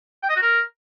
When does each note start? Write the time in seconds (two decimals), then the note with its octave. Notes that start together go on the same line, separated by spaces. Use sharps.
0.23 G5
0.29 D#5
0.36 F#4
0.42 A#4